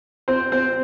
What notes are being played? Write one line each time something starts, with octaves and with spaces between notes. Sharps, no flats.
C4 C5
C4 C5